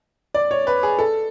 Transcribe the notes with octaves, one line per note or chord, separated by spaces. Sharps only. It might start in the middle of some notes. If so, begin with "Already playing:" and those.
D5
C#5
B4
G#4
A4